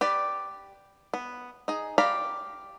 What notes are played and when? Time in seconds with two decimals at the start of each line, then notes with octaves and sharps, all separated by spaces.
0.01 G4 B4 D5
1.14 B3
1.68 D#4 G#4
1.98 G4 D5 F5 A#5 B5